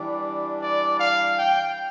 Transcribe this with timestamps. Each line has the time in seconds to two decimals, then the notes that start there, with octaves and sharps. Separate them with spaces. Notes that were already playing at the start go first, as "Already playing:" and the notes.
Already playing: E3 G3 D4 D5
0.60 D5
0.99 F5
1.37 G5